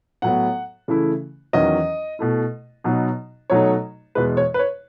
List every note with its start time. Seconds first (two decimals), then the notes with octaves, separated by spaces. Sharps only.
0.22 A2 F#3 B3 F#5
0.88 C#3 E3 A3 E4
1.53 E2 D#3 F#3 C#4 D#5
2.19 B2 A3 E4
2.84 B2 F#3 B3 D#4
3.50 B2 F#3 A3 D#4 C#5
4.15 E2 B2 G#3 B4
4.37 C#5
4.54 B4
4.59 C#5